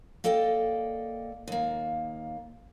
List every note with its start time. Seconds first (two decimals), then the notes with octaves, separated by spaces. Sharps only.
0.24 A#3 A4 D5 D#5 G5
1.48 D#2 A#3